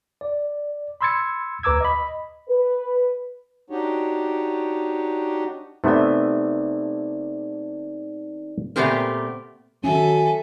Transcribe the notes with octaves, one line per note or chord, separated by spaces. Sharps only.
D5
B5 C6 E6 G#6 A6 C#7
D2 B4 A#5 D6 E6 G#6
D#5 B5
B4
D4 D#4 F#4 G4 C#5
C3 A3 B3 D#4 D5
A#2 A3 B3 C4 G4 A#4
D#3 F#3 C#4 A4 E5 G#5